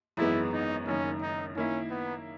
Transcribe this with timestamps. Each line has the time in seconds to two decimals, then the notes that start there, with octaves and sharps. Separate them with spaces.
0.17 G#1 F#2 E3 G#3 B3 E4
0.53 D#4
0.87 F#1 F#2 D#3 C#4
1.22 D#4
1.55 D#3 A#3 C#4 E4
1.90 B3